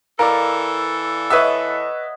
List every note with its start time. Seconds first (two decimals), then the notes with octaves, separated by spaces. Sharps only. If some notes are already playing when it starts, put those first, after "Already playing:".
0.19 E3 A4 A#4 D5 F5
1.30 B4 C#5 D#5 E5 F#5